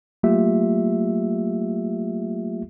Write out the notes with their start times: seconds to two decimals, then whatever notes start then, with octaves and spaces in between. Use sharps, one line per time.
0.23 F#3 A3 A#3 F4 G4 E5